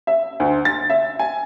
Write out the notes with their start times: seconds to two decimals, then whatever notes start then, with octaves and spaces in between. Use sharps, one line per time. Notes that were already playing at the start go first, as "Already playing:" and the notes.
0.07 E5
0.40 D2
0.65 A6
0.90 E5
1.19 G#5